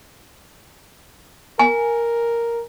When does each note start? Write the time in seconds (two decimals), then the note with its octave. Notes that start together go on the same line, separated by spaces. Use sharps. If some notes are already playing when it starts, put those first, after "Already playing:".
1.59 A#4 G#5